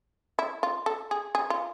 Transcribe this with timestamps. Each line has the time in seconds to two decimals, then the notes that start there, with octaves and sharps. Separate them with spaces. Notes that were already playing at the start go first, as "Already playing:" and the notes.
0.39 E4
0.63 F4
0.86 A4
1.11 G#4
1.35 G#4
1.50 F4